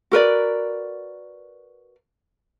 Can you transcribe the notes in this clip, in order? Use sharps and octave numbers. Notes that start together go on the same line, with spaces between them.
F#4 A#4 B4 D5